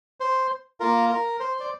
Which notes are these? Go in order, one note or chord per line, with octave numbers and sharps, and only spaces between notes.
C5
A#3 F4 A#4
A#4
C5
D5